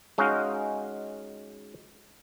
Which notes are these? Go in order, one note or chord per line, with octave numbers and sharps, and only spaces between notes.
G#3 C#4 D#4 F#4 F5